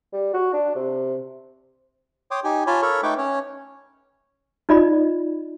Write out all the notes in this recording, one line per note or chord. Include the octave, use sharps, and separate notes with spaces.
G3
F#4
D4
C3
C#5 G5 C6 D6 D#6
D#4 G4 G#5
F4 C#5 G#5 A5 B5
A4 A#4 C#5 B5 C#6
A3 D#4 B4 G5 C#6 D6
C#4 C#5
D#4 F4 D5 D#5 B5